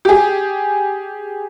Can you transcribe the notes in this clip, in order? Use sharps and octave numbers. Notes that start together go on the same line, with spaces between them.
G4 G#4